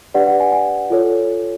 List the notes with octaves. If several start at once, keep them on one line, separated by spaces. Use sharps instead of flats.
D4 G4 B4 D5 F#5
F#5
G#5
G#5
F4 A4 C#5